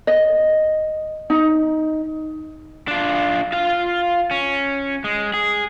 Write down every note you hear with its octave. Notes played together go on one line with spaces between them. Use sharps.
D#5
D#4
D4 F4
F4 F5
C#4
G#3
G#4